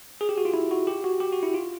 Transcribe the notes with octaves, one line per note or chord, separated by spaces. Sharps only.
G#4
G4
F#4
F4
E4
F#4
G4
F#4
G4
F#4
E4
F4